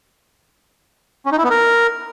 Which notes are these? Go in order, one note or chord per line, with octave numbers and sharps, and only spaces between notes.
C#4
D#4
E4
B3
A#4